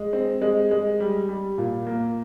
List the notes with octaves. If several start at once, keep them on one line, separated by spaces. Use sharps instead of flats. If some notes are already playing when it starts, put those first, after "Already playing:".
Already playing: G#3
C4
G#3
G#3
G3
G3
A#2
A#3